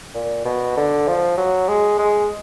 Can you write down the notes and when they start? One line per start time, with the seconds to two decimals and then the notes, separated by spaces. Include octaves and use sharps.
0.15 A#2
0.45 B2
0.77 D3
1.08 F3
1.38 F#3
1.68 G#3
1.99 G#3